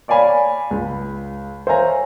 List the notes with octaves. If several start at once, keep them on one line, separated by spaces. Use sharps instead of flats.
C#5 D5 F5 G#5 B5
C#2
C5 C#5 E5 F5 G#5 A#5